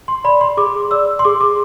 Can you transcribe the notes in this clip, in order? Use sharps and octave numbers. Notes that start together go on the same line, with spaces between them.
C6
D5 B5
C6
G#4 D6
D5 E6
C6
G#4 D6
D6